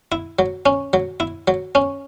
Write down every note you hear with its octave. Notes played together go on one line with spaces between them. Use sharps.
E4
F#3
C#4
F#3
E4
F#3
C#4